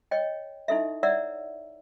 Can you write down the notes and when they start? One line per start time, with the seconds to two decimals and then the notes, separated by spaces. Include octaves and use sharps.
0.11 C#5 D#5 G5
0.68 D#4 E4 F#4 A4 D#5 E5
1.03 C#5 D5 E5 F#5 A#5 E6